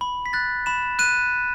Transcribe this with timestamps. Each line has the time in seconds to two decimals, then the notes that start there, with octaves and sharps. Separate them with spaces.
0.01 B5
0.26 B6
0.33 F#6 A6
0.66 B5 E7
0.99 F#6 D#7